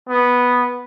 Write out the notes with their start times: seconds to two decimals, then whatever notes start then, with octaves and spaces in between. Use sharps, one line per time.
0.09 B3